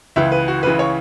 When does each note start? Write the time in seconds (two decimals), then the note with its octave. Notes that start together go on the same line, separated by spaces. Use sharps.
0.16 C#2 C#3 E3 E5
0.32 B4
0.48 F#4
0.63 C#2 C#3 E3 B4
0.79 C#5